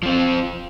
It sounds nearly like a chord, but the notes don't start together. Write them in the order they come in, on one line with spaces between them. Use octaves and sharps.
F3 C4 F4